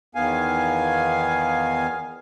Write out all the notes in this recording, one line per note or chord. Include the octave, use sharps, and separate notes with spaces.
E2 D#3 B3 F5 G#5